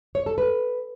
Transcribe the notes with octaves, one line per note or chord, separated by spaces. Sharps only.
C#5
A4
B4